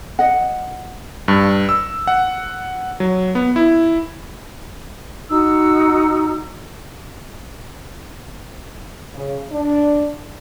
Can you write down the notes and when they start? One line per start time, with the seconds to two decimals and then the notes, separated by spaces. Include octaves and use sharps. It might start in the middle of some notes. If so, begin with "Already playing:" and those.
0.19 D#5 F#5
1.28 G2
1.69 E6
2.07 F#5
3.00 F#3
3.35 B3
3.56 E4
5.30 D#4 F#4 E6
9.14 C#3
9.52 D4